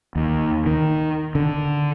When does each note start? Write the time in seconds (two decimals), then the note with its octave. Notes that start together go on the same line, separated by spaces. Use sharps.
0.16 D#2
0.66 D#3
1.35 D3